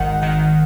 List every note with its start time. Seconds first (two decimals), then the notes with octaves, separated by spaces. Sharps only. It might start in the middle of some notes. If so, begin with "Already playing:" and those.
Already playing: G#1 D#3 F#5
0.22 D#3 F#5